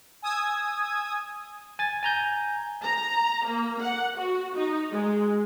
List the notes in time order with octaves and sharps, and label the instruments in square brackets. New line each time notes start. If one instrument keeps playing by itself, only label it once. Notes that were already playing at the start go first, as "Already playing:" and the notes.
[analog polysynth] G#5 D#6 E6 G#6
[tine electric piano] G#5 A6
G#5 A#5 G6
[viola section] A#5
A#3
F#5
F#4
D#4
G#3